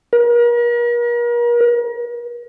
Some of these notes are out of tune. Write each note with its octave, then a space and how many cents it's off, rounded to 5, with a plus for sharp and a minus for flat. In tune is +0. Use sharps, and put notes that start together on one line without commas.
A#4 +40